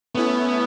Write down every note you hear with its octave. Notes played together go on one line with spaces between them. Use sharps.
A3 B3 C#4 E4